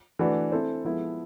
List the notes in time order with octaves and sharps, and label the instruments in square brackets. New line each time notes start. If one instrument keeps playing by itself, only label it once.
[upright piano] E3 A3 D4 F#4 B4
C4 E4 A4 C5
F3 G#3 B3 E4 A4